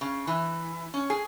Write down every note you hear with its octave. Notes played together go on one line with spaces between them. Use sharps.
C#3
E3
C#4
G#4